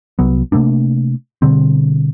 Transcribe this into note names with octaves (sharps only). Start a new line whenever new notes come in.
C2 F#3 B3
C3 A3 A#3 D4
B2 D3 G3 C4